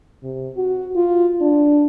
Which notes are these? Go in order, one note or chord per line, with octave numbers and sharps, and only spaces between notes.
C3
F#4
F4
D4